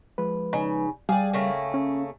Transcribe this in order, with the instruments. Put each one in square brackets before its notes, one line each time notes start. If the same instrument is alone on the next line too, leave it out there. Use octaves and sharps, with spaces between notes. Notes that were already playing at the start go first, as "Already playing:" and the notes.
[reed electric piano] F3 G#3 B4
[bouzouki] C#3 [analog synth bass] D#4
[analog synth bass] G3 [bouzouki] G#4 D5 [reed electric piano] F5 G5
[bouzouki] C#3 A3 A#3
[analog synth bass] C#4